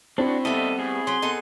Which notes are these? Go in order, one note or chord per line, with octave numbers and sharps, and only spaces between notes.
A2 C4 D4 E4 F#4
D#2 G3 B3 A4 D#5 E5
A2 G#4
F#3 C#4 C6
B3 D#4 A4